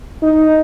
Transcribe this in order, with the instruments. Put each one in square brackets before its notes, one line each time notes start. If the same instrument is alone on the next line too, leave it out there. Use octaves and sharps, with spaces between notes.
[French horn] D#4